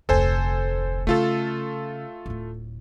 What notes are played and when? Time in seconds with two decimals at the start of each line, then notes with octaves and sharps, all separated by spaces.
0.09 F1 D2 A4 C5 G#5
1.07 C#3 A3 F4 A4
2.26 D1 A2